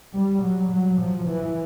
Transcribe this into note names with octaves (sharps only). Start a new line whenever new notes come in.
G3
F#3
F#3
F3
E3